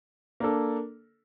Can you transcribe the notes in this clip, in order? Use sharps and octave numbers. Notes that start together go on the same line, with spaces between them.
A#3 D4 A4